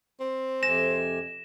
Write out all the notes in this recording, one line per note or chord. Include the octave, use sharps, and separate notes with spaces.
C4
F2 C3 G#5 A#6 E7